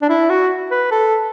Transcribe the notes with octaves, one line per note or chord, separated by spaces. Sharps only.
D4
E4
F#4
B4
A4